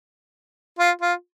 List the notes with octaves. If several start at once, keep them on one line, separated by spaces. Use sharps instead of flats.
F4
F4